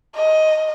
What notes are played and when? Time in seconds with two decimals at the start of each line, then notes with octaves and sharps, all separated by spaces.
0.16 D#5